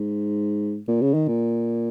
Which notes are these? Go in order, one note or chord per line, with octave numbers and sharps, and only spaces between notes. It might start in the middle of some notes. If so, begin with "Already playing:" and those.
Already playing: G#2
A#2
C#3
D#3
A#2